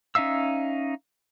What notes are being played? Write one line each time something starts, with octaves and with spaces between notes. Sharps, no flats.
C#4 D#4 E5 F5 E6